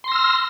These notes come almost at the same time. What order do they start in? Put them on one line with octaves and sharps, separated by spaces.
C6 A#6 E6 F6